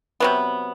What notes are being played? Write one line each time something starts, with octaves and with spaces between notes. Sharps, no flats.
C3 F#3 B3